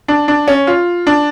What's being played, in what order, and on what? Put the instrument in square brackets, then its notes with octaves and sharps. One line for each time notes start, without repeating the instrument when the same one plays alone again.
[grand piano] D4
D4
C#4
F4
D4